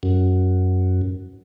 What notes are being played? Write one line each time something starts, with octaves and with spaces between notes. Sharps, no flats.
F#2